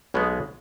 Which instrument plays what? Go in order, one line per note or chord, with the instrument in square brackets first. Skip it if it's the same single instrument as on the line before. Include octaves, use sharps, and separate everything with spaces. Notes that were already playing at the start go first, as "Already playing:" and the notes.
[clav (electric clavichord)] B1 B2 G#3 B3